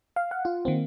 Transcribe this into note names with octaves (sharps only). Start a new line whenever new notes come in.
F5
F#5
F4
D#3 A#3 C4